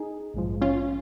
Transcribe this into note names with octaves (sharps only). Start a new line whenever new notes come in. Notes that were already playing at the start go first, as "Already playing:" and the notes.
Already playing: D#4 G#4
A#1 G#2 F3
C#4 F4